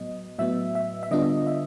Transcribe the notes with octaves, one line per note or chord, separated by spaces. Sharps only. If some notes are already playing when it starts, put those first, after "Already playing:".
Already playing: A2 F#3 B3 D#5
A2 F#3 B3 E5
E5
E5
D3 G3 B3 D4 F4 D#5
E5